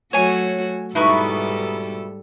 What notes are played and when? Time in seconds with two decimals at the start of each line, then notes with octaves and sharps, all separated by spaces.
0.13 F#3 A3 F#4 C#5 G#5 C#6
0.95 G#2 B2 G3 D#4 E4 A4 B4 C#6